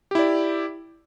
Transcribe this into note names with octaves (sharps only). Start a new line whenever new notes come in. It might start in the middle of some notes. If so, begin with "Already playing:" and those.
E4 G4 D5